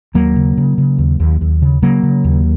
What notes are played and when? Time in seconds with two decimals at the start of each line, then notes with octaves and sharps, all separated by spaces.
0.15 D#2 F#3 A#3
0.36 C#3
0.57 C#3
0.78 C#3
0.98 D#2
1.20 D#2
1.41 D#2
1.62 C#3
1.82 C#3 F#3 A#3
2.03 C#3
2.24 D#2